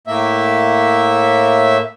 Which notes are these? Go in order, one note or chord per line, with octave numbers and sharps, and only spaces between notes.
A2 A#3 E5